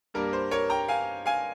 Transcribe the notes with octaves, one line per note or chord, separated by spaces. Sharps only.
G2 G3 A#3 A#4
C5
A#4 C#5
G5 A#5
F5 G#5
F5 G#5